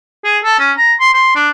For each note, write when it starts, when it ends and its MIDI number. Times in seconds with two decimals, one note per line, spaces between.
0.25 0.38 68
0.44 0.59 69
0.60 0.72 61
0.77 0.93 82
1.00 1.11 84
1.14 1.34 84
1.35 1.49 62